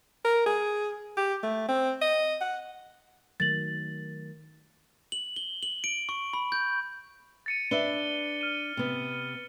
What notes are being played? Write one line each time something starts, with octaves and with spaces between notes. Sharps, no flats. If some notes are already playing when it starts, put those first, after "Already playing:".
A#4
G#4
G4
A3
C4
D#5
F#5
D#3 F#3 A3 A6 F#7
F#7
G7
F#7
D7
C#6
B5
G6
A6 C#7 D#7
D4 B4 E5 G7
F6 D#7
C3 B3